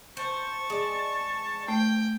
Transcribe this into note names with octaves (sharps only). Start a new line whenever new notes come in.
C5 A5 C#6
G#3 D5
A3 G5